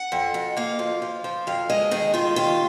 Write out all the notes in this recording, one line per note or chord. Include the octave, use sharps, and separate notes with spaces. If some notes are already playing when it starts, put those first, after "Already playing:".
Already playing: F#5
F2
F2
A#3 F5
F3
F3
F3
F2 F5
G#3 D#5
D#3 G#4
D#3 F4
D#2 F4